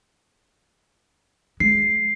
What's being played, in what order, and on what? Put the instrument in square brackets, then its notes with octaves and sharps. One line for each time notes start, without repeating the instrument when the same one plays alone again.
[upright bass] G#3 [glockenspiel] C7